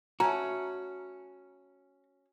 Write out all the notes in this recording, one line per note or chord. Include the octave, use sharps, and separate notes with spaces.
A3 C#4 F#4 A#5